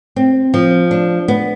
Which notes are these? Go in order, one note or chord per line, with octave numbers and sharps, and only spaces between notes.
C4
F3
D4
B3